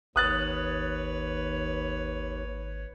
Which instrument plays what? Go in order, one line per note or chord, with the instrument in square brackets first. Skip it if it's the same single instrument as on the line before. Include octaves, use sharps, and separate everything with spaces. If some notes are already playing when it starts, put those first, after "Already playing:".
[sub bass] G#1 [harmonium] D#2 [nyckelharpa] B4 C#5 [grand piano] D#6 F#6 A6